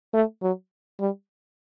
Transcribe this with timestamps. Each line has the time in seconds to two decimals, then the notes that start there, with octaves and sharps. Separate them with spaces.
0.14 A3
0.42 F#3
1.00 G3